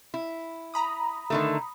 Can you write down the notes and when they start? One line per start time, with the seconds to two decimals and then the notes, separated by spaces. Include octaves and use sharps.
0.14 E4
0.74 A#5 B5 D#6
1.30 D3 D#3 A3